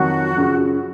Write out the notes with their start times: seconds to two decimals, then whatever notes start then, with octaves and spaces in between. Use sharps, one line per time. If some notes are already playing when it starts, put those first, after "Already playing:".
Already playing: F2 D#3 F#3 F#4
0.36 F#2 C#3 F3